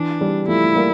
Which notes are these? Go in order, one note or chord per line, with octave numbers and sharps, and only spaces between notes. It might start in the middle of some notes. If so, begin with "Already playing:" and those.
Already playing: E3 D4
E3 G3
F3 A3 E4
A3
G3 A#3